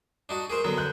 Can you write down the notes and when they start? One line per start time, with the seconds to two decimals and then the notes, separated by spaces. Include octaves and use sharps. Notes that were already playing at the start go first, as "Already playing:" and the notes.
0.29 D4 D#4 F#4
0.50 G#4 A#4 C5
0.64 D3 F#3 B3
0.78 F#6 G6